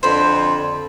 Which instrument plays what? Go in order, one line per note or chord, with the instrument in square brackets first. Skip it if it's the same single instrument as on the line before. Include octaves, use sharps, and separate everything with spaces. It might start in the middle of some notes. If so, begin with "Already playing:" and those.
[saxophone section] F2 D3 [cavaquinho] C5 B5